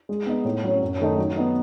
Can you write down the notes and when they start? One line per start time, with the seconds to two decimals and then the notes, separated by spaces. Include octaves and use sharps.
0.09 G#3
0.26 B3 D#4
0.45 A2
0.64 F#3 C#4
0.81 F#2
1.00 D#3 A3 D#4
1.18 F#3
1.37 B3 D#4